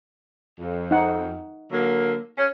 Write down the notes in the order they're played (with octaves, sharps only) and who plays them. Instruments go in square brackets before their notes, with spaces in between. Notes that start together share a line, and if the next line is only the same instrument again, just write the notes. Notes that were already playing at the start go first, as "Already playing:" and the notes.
[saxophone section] F2
[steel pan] D#4 F#5
[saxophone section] D3 F#3 A#3
C#4